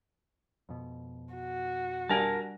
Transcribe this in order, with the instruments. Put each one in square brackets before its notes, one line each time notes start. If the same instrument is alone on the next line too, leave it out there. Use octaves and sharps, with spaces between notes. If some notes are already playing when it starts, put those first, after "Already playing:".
[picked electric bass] F2 B2
[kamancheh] F#4
[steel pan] G3 D4 G#5 [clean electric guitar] A#4 A5